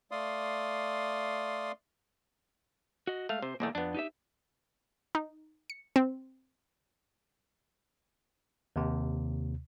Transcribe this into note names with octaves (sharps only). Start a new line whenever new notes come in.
A3 D5 F5 C6 D#6
F#4 D#5
G#3 A3 F5
C3 C5
B1 E2 A3 A#3
F2 B3 D4
D#4 G4 E5
D#4
C#7
C4
D#2 C3